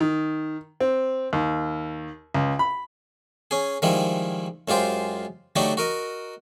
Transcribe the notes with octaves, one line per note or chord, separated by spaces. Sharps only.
D#3
C4
D#2
C#2
B5
C#4 G#4
D#3 F3 G3 G#3 E4
F#2 G#3 F4 G4 C5
D3 F#3 A3 D4 D#4 G4
F#4 A#4 D#5